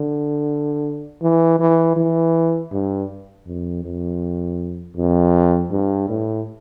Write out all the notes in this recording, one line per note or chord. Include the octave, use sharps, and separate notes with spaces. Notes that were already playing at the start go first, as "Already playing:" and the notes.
Already playing: D3
E3
E3
E3
G2
F2
F2
F2
G2
A2